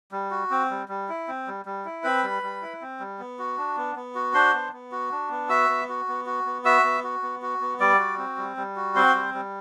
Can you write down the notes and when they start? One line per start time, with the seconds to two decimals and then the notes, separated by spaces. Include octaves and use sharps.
0.12 G3
0.31 F#4
0.51 C4
0.71 G3
0.89 G3
1.09 E4
1.28 C4
1.47 G3
1.65 G3
1.85 E4
2.04 C4 B4 B5
2.23 G3
2.43 G3
2.62 E4
2.81 C4
3.00 G3
3.19 B3
3.39 F#4
3.58 D4
3.77 B3
3.96 B3
4.15 F#4
4.34 D4 C5 C6
4.54 B3
4.72 B3
4.92 F#4
5.12 D4
5.30 B3
5.49 F#4 E5 E6
5.69 B3
5.89 F#4
6.08 B3
6.26 F#4
6.46 B3
6.65 F#4 E5 E6
6.84 B3
7.04 F#4
7.23 B3
7.42 F#4
7.61 B3
7.80 G3 D5 D6
7.99 F#4
8.18 C4
8.37 G3
8.57 G3
8.76 F#4
8.96 C4 C5 C6
9.14 G3
9.34 G3